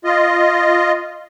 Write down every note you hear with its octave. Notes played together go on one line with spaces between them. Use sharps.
F4 D#5